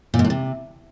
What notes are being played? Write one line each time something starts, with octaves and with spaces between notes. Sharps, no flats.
A#2
G#2
A2
C3